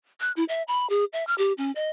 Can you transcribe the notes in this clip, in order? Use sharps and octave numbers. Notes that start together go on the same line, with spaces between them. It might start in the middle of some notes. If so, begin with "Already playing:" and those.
F#6
E4
E5
B5
G#4
E5
F6
G4
C#4
D#5